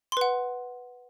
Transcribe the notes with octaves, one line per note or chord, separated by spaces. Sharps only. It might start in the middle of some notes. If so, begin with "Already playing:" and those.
B4 F#5 C6